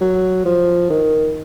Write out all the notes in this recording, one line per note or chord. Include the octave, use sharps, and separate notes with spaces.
F#3
F3
D#3